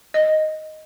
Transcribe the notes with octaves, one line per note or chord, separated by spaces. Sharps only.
D#5